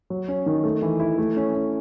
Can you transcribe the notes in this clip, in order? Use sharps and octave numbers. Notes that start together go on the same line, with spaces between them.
F#3
C#4
D#3
A3
E3
E4
A3
C#4
C#4